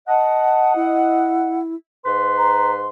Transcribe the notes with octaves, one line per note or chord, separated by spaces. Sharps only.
D#5 F#5 A5
E4
G#2 B4 C6
A#5